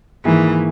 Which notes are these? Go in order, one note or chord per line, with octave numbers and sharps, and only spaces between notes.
G#2 D#3 E3 A#3 E4 G#4